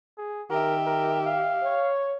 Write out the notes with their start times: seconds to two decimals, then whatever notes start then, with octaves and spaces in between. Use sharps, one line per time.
0.18 G#4
0.50 D#3 G4 A#4 E5
0.87 A#4
1.26 F5
1.63 C#5